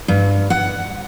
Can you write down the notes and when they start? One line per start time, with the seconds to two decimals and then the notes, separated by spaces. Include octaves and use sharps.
0.08 G2
0.50 F#5